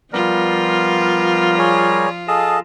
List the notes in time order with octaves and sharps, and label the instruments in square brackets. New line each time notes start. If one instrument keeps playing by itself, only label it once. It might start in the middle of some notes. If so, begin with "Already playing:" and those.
[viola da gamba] F3 F4 [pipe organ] G3 A#4 [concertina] B3
[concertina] G#4 C#5
[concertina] G#4 A4 F5 [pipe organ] D#5 A5